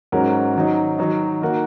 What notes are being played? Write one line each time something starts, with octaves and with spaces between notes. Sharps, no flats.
G#2 F#3 C#4 F#4 A#4
D#3 F#3 D#4
D#3 F#3 D#4
D#3 A#3 F#4 A#4